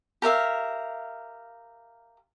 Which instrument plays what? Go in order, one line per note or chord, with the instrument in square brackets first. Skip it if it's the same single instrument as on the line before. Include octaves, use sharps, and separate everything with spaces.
[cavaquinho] G4 A#4 E5 F5